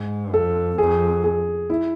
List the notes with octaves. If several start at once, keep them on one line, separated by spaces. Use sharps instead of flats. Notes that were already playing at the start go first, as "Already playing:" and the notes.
Already playing: G#2
F2 A4
F2 G#4
G#4
E4